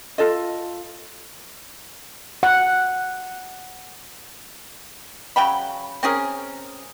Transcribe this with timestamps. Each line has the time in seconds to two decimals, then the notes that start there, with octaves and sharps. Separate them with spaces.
0.18 F4 A4 D#5
2.43 F#5
5.36 C#3 F#3 G5 B5
6.03 C4 C#4 G#4 A#4